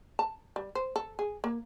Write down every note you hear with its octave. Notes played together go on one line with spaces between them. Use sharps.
A5
G3
C5
A4
G#4
A#3